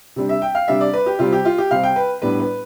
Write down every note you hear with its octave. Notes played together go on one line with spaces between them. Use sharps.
C3 G3 D4
E5
G5
F5
C3 G3 D4 E5
D5
B4
G4
C3 G3 C4 F4
G4
F4
G4
C3 G3 C4 F5
G5
B4
A2 G3 B3 D4 B4
B4